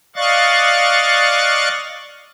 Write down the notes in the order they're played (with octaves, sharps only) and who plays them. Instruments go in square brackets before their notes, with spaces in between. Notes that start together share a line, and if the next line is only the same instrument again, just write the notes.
[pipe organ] D5 D#5 F5 C#6 F#6 A6